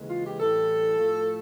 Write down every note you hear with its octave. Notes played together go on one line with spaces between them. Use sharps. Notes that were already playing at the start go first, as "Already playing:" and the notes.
Already playing: D#2 C#3 E3 G#3
F4
G4
A2 E3 G3 A4
A2 F3 A3